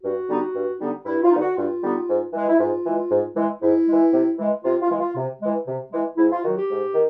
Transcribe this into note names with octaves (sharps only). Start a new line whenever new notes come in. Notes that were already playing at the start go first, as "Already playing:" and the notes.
G2 F#4
D3 G3 B3 D#4
G2
D3 G3 B3 D#4
G2 E4
F4
D3 G3 B3 D#4
F#4
G2 F4
D3 G3 B3 D#4
G#2
E3 G#3
E4
G#2 F4
E3 G#3
G#2
E3 G#3
G#2 E4
E3 G#3
C3
E3 G#3
C3 F4
F4
E3 G#3
F4
C3
E3 G#3
C3
E3 G#3
G#2 E4
F4
D#3 F#3 F#4
G4
G#2
D#3